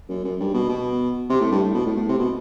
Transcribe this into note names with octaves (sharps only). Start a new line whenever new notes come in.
F#2
F#2
G2
B2
B2
C3
A2
G2
A2
B2
A2
A2
C3
B2